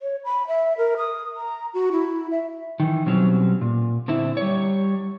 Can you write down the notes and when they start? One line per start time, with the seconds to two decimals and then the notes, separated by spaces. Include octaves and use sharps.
0.01 C#5
0.24 B5
0.48 E5
0.78 A#4
0.97 D#6
1.36 A#5
1.74 F#4
1.92 E4
2.31 E5
2.80 D#3 E3
3.06 B2 F#3 G3 C4 C#4
3.61 A#2
4.08 D3 C4 E4
4.37 G3 C#5